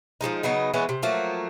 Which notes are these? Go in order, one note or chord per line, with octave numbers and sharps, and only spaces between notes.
F3 G3 G#3 D#4
C#3 F#3 B3 D#4
E3 G#3 B3 C#4
C3
F3 F#3 A3 A#3